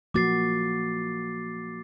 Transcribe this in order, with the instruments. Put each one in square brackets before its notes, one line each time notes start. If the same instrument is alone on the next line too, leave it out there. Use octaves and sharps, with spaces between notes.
[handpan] F3 A#3 F#4 [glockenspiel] D6 A6 C7